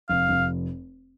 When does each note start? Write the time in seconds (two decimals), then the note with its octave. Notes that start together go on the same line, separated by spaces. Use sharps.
0.09 F1 F5
0.29 F1